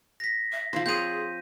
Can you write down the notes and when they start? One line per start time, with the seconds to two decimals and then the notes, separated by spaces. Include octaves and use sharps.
0.20 A#6 B6
0.52 E5
0.73 F3 C5 F5
0.86 C4 G#4 C#5 G6 D#7